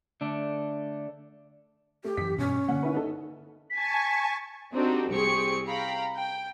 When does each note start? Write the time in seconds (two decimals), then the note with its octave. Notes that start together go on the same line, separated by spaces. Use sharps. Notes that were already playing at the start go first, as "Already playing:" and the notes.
0.21 D3 A3 D4 D5
2.04 A3 G4
2.17 F#2 E3 B6
2.38 G2 B2 C#4
2.69 D3 A#3 F#5
2.83 D#3 E4 B4
2.94 D#4 A4
3.70 G#5 A5 C#6 B6
4.73 C4 D4 D#4 F#4 G4 A4
5.10 C2 C4 G4 G#4 C#6 C#7
5.68 F5 G5 A#5 B5
6.16 G5